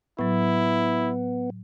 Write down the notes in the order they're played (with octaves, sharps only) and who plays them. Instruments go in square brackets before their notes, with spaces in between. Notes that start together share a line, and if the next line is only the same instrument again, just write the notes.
[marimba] A2 F#3 [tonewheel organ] B3 [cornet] E4